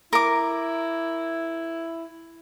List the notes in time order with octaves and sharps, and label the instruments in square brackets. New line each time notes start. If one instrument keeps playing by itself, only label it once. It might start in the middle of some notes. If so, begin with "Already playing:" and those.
[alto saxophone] E4 [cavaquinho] A#4 D6